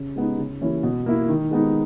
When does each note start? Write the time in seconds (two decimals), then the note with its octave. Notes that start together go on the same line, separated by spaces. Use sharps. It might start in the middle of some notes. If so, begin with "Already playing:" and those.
Already playing: C#3
0.16 G#3 B3 D#4
0.39 C#3
0.61 E3 A#3 C#4 E4
0.83 B2
1.06 A#3 E4
1.28 D#3
1.51 G#3 B3 D#4